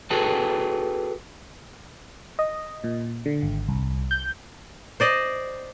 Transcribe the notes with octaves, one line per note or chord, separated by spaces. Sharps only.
F#4 G#4 A4 B4 G5 A5
D#5
A#2
D3
G#1
C2
G6
C5 D5 D#5